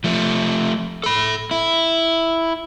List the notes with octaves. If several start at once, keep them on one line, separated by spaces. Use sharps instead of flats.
F3 A3
A4 B5
E4